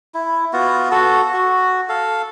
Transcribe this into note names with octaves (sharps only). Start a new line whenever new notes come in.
E4
B3 F4 F#4
F#4 A4
F#4
A4 F5